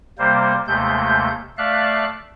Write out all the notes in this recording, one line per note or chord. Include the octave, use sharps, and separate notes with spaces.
C3 G3 A#3 C5
D#2 C3 G#3 A3 G6
A3 D5 E5 F5 F#6